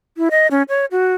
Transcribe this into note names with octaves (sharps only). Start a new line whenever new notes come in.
E4
D#5
C#4
C#5
F#4